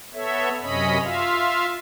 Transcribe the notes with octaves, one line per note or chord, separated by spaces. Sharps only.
B3 A4 C#5 E5
F#2 C3 C#4 C#5 D#5 B5
F4 E5 F5